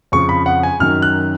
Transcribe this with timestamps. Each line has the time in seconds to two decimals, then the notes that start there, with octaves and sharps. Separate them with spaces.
0.12 F2 C#3 F3 C#6
0.29 B5
0.46 F#5
0.63 G#5
0.80 F#2 D#3 F#3 F6
1.02 F#6